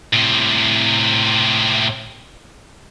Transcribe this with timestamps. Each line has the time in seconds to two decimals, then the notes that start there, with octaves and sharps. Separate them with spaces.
0.13 A2 C3